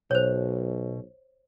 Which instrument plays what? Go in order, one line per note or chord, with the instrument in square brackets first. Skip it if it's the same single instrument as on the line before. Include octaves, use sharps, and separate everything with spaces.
[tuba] B1 [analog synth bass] B2 [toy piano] C5 C#5